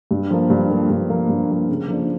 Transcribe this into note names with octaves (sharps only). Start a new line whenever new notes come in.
G2
F3 A#3
G2
F3 A#3
G2
F3 A#3
G2
F3 A#3
C#3
F3 A#3 D4